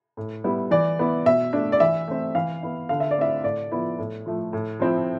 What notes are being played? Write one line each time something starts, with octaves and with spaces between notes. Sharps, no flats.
A2
G3 B3 E4
E3 D5
B3 E4
B2 E5
A3 D4
D5
E3 E5
A3 C4
E3 F5
B3 E4
D3 F5
E5
D5
A3 C4 E4 E5
A2 D5
F3 B3 E4
A2
F3 A3
A2
F3 C4 E4